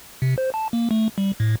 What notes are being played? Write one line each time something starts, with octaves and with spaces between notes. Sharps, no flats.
C3
C5
A5
A#3
A3
G3
A2